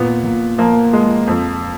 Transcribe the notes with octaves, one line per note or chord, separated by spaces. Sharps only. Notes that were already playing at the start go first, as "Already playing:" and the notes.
Already playing: A#2 B3
A#2
F3 A#3
G#3
F2